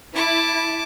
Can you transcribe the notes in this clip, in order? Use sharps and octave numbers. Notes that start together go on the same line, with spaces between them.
E4 A5 D6